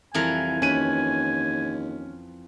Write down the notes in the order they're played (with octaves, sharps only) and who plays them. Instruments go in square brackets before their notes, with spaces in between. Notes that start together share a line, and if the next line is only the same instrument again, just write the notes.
[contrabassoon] C2 [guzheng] F2 E3 A#4 [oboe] G#5
[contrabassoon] D#2 [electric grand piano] C#4 D#7 [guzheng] B4